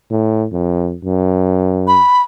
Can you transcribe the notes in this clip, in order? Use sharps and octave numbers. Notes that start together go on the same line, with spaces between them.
A2
F2
F#2
B5